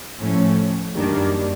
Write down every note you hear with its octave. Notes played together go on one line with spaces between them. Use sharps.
A2 F3 A3 C#4
F#2 D#3 G3 A#3 D4